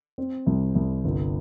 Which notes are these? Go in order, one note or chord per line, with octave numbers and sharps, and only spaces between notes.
C4
C2
C2
G1